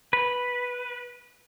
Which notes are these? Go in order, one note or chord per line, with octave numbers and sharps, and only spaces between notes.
B4